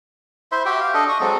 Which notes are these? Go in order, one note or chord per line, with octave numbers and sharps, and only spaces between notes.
E4 C5 E5 C6
F#4 G4 E5 G5
F5
D4 A4 D#5
C#6 D#6
F#3 G#3 C4 A4